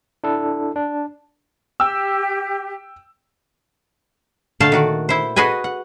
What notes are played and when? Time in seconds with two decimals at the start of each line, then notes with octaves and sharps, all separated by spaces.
0.24 D4 E4 A4
0.76 D4
1.80 G4 G5 E6
4.60 A#2 D3 A3 F5 A5
4.72 D#3 F#4 D5
5.09 E4 C5
5.36 F#4 G#4 B4 D#5 G#5
5.64 F#5